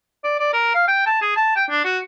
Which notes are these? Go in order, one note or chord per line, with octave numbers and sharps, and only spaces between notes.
D5
D5
A#4
F5
G5
A5
G#4
A5
G5
D4
F#4